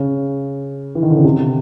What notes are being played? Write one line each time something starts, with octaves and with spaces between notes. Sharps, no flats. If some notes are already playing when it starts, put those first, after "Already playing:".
Already playing: C#3
E3
D#3
D3
C#3
C3